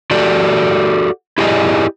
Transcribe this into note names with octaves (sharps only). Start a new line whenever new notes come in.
F#4 G4 A4 D5
E4 G4 G#4 D5 D#5